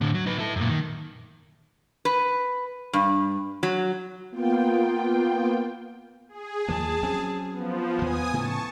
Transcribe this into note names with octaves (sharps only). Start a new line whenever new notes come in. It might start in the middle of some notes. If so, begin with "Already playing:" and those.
A2 D3
F#3
D#4 B4
E4 A4
F#2 A#2
D#3
B4
G2
F#3
A#3 B3 F4 G5
G#4
D#2 F3 A#3 A5
F#3 C4 C#4
F3 B3
D#2 F3 G#5 D#6
A2 C#3 A5 C#6